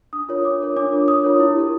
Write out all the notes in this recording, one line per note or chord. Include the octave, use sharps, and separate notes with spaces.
D4 D#6
F4 A#4 C#5
D4 D6
F4 A#4 C#5
D4 D6
F4 A#4 C#5
D4 D#6
F4 A#4 C#5
E4
G4 A#4